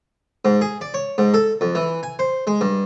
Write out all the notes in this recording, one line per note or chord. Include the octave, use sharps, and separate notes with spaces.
G#2
G#4
D5
C#5
G#2
A4
F2
E3
G#5
C5
G#3
G2